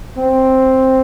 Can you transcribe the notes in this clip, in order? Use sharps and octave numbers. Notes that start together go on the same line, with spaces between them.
C4